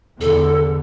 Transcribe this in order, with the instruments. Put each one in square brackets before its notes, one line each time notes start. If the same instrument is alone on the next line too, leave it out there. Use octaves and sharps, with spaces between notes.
[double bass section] E2 D3 [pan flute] A4